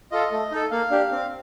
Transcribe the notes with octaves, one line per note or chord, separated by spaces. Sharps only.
F4 A4 D#5
A3
D#4 A4
A#3 F5
D4 G4
C4